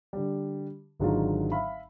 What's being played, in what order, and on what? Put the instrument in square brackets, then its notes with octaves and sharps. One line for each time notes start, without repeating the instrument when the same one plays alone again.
[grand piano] D3 G3
G#1 D3 F#3 G#3 D#4 F4
E5 F5 B5